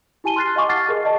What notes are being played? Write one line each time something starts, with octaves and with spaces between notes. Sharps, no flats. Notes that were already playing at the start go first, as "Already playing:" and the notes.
E4 G4 G#5 A5 D#7 G7
C6 F6 F#6 A6 C7
G4 D#5 F5 G#5 C#6 D6
F#5 A5 F6 A6 C7
G#4 A#4 D#5
D5 D#5 A5